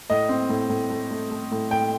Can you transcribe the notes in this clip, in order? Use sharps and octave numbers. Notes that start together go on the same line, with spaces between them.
A2 D#5
C4
A2
A2
A3
A3
A3
A2
A2 G5